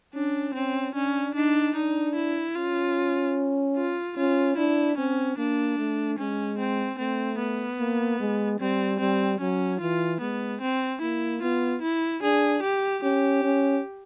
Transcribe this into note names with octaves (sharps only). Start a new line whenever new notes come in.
C#4 D4
C4 C#4
C#4 D4
D4 D#4
D4 D#4
E4
C#4 F4
F4
C#4 F4
D4 E4
C4 C#4
A#3 D4
A3
G#3 C#4
C4
A3 C4
B3
A#3
G#3
G3 C4
G3 C4
F#3 C#4
E3 F4
G#3 B3
C4
A#3 E4
B3 F4
E4
D4 G#4
G4
C#4 G4
C#4